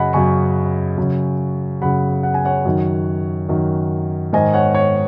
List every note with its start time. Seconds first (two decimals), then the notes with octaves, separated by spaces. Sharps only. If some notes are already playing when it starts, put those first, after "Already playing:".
Already playing: F#2 C#3 D#5 F#5 G#5 B5
0.13 F#2 C#3 G#5 C#6
0.97 F#2 C#3
1.82 F#2 C#3 F#5 B5
2.23 F#5
2.34 G#5
2.45 C#5 F#5
2.65 F#2 D#3
3.49 F#2 D#3
4.33 G#2 D#3 D#5 G#5
4.54 C#5 F#5
4.75 C#5